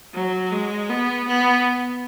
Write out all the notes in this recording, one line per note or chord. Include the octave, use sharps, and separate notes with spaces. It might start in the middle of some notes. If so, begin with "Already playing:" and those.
F#3
G#3
B3
B3